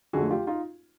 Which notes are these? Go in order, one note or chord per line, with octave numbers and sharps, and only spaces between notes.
F2 D3 F#3 A3 F#4 G#4
F4 G4
D#4 F4